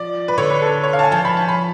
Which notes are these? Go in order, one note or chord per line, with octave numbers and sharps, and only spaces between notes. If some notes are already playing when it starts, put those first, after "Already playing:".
Already playing: F3 D5
B4
D3 C#5
B4
A4
C#5
F5
A5
G#5
F3 A5
B5
A5
B5